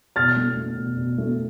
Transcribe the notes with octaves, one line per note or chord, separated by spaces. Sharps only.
B2 F6 A6
A3
A3
B2
B2
A3